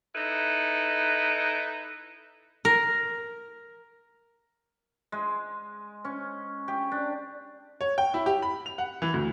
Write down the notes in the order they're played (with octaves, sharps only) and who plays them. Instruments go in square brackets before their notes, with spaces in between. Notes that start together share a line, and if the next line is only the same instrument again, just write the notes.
[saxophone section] D#4 E4 A4 B4
[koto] A#4
[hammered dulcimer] G#3
C#4
G4
D4
[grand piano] C#5
G5
E4
G4
B5
F7
F#5
E3
D2